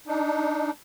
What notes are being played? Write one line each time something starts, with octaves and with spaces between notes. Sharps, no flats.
D4 D#4